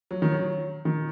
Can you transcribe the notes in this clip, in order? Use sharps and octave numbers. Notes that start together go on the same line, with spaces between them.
F#3
D#3
F#3
D#3